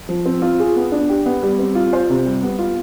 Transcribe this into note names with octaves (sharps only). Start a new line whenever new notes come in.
F3
C4
F4
G#4
B3
D4
G4
B3
G3
C4
F4
C5
C3
G3
B3
F4